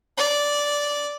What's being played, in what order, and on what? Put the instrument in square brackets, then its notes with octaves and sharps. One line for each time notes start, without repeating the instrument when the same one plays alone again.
[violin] D5